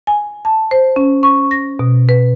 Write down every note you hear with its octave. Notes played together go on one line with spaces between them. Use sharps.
G#5
A5
C5
C#4
C#6
A#6
B2
B4